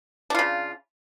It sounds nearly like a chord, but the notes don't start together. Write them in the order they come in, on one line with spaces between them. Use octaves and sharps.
D4 F4 C#3